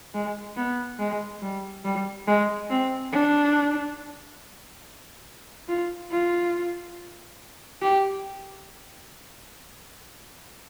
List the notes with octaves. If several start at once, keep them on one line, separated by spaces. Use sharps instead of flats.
G#3
B3
G#3
G3
G3
G#3
C4
D4
F4
F4
G4